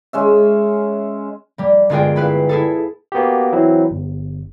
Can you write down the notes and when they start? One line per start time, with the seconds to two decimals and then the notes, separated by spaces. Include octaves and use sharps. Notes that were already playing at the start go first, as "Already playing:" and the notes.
0.13 G#3 C#4 E5
1.58 G3 A#3
1.90 G1 G#3 F4 G#4 A#4 G5
2.16 E4 B4 F5
2.49 E4 G#4 A4
3.12 A#3 B3 F#4 G4
3.52 E3 F#3 C4 E4
3.91 G1